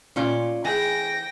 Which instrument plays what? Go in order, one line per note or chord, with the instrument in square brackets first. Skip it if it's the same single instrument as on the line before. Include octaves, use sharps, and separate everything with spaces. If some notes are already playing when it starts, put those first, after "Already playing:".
[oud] A#2 [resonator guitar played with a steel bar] C#4 F4 D5
[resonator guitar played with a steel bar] E3 [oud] G#4 [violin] G5 A#6